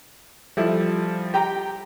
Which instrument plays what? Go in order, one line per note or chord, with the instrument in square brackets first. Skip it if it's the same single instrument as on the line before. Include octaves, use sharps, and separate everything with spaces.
[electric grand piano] F3 G3 [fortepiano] A3 E4
[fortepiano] G4 G5 A#5